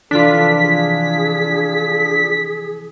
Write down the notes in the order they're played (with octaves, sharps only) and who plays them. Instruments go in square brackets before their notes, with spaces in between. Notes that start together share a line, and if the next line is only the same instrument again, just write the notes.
[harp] C3 E3 F3 [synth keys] D4 F4 [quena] A4 [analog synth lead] B6
[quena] G#4